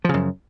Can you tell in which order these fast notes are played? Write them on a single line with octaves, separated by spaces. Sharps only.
F3 C#3 F#2